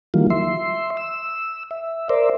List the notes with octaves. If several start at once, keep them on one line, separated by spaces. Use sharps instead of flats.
D#3 E3 F#3 G3 A#3 F4
E5 C6
E6
E5
A#4 C5 D5 E5